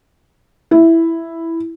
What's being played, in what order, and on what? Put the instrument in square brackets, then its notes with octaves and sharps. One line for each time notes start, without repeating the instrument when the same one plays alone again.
[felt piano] E4